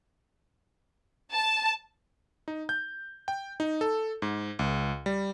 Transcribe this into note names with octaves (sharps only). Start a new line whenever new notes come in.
A5
D#4
G6
G5
D#4
A4
G#2
C#2
G3